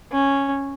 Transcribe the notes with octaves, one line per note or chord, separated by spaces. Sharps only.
C#4